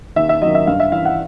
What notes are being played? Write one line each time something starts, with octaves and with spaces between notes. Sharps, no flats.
D#2 E5
E5
D#3 F#3 D#5
E5
G2 F5
E5
E3 F5
F#5